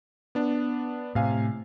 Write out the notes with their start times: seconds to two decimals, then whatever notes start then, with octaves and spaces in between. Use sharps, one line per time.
0.35 B3 D4
1.15 A2 C3 F5 G#5